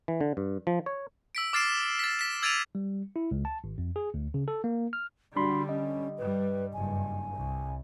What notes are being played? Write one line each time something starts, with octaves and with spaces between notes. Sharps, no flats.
E3
D3
G2
F3
C#5
E6 B6 D7
D6 F6 A6 C7 D7 E7
A6 B6
B6 E7
E6 G#6 A6 D7 D#7 F7
G3
E4
C#2
A5
G#1
F2
G#4
D2
C#3
A4
A#3
F6
D3 G3 D4 F#4 B5 C6
C#4 D#5
G2 G3 B4
F#1 G2 G#5
C2